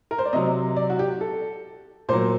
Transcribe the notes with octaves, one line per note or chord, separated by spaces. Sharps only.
A#4
C5
D5
C3 F#3 D#5
D5
F#4
G4
A4
A#2 F#3 C5